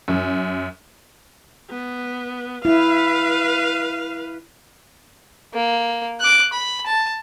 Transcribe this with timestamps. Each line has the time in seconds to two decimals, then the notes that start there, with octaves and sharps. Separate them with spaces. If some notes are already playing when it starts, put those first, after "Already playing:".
0.08 F#2
1.70 B3
2.65 E4 B4 F5
5.54 A#3
6.20 D6 F#6
6.53 B5
6.86 A5